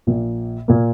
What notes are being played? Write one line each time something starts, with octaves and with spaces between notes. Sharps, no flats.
A#1 A#2 A#3
A#2 A#3